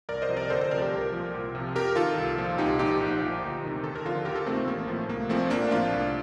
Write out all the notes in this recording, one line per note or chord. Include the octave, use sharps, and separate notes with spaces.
C2 A#4 D5
C5 D#5
C3 F3
A#4 D5
D2 A4 C5
A4 C5
C3 F3 A#4 D5
G4 A#4
C2
A#2 F3
C2
C3 F3
F2 G4 A#4
D#3 F4 A4
C2
A#2 F3
C2 D#4 G4
A#2 F3 D#4 G4
A#1
A#2 F3
D2
C3 D#3
D#2 A4
A#4
D3 F3 F4 A4
D2 G4 A#4
F4 A4
C3 D#3 A3 C4
A3 C4
A1 A#3
A2 F3 A3
C2 A#3
A#2 F3 A3 C4
A#1 A#3 D4
A2 F3 D4 F4
C2